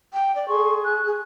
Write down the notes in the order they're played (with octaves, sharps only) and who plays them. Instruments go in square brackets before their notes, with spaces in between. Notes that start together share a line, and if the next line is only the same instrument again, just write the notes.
[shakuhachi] G5
D5
[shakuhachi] G#4 [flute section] A4 C6 C#6
[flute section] F#6
[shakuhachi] G#4